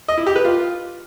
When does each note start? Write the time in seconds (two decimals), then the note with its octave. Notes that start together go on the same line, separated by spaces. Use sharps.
0.08 D#5
0.17 E4
0.27 G4
0.36 B4
0.45 F4